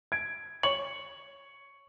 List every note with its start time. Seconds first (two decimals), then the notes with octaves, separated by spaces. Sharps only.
0.12 G#6 D7
0.63 C#5 F#7